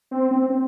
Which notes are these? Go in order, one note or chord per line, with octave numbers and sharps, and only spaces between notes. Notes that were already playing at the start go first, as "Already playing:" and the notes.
C4
C4
C4